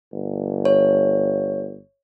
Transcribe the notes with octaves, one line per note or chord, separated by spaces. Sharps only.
G1
C#5